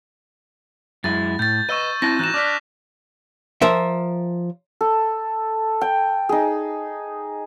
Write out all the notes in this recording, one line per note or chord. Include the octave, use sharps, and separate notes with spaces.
F#2 G#3 E4 A6
A2 G6 A6
B4 D#5 C#6 E6 D#7
C4 E4 A5 A6 A#6
E3 D#4 F#4 F#6 E7
D4 D5 D6 F6 B6
F3 A#4 E5
A4
G5
D#4 G#4